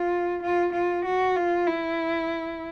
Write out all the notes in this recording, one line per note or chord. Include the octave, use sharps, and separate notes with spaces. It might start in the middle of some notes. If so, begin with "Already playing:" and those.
Already playing: F4
F4
F4
F#4
F4
E4